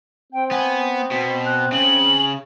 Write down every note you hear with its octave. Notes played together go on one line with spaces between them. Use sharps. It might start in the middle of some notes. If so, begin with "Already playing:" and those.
C4 G5
B3 G#5
B2 B6
F#6
C#3 F#7